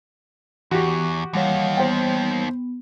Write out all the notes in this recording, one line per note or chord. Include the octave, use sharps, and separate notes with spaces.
E2 E3 F#4 G4 C#6 D6
D#2 D#3 E3 G3 C#5 F5 F#5
B3 C5 G5